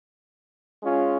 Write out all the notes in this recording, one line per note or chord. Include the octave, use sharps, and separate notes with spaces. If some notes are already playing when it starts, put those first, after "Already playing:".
G#3 C#4 F4